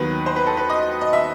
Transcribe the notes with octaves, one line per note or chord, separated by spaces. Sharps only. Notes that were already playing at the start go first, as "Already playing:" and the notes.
Already playing: D#2 D#3 F#3 B3 B4
C5
B4
A4
B4
D#5
D#5
E5